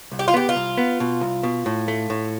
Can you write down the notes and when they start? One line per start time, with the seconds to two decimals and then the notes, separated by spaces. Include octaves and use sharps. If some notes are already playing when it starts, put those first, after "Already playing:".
0.12 C2
0.19 G4
0.28 F4
0.34 B3 G4
0.49 F4
0.55 C2
0.77 B3
1.00 B2
1.21 C2
1.43 B2
1.66 A2
1.88 A3
2.10 A2